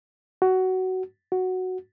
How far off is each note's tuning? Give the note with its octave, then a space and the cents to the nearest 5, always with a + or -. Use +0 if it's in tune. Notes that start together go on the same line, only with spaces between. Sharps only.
F#4 +15
F#4 +0